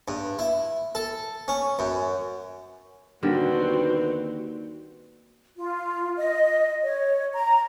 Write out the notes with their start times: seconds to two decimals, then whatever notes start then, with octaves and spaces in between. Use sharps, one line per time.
0.08 G2
0.39 E4
0.95 A4
1.48 C#4
1.79 F#2
3.23 D#2 B2 D3 G3 C4 F#4 A#4 B4
5.57 F4
6.17 D#5
6.83 C#5
7.34 A#5